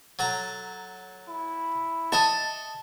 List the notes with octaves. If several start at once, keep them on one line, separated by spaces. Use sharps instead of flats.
F#3 A4 A#5
E4
D#5 E5 A5 C#6